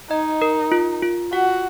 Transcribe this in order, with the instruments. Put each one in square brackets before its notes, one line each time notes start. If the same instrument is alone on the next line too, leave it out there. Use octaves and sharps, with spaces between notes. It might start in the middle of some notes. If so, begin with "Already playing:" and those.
[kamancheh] D#4 [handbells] D#5
[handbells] A#4
F4
F4
[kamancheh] F#4 [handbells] F#5